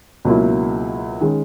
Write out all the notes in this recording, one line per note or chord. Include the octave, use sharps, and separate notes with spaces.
C#2 B2 F#3 A#3 E4
D#3 G#3 C#4